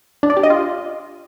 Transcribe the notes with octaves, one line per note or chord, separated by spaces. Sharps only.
D4
D5
G4
D#5
F4